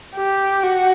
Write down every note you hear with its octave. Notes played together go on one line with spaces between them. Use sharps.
G4
F#4